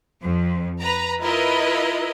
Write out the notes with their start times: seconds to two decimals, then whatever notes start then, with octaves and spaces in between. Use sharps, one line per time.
0.22 F2
0.82 B4 A#5
1.21 E4 F4 A#4 B4 D#5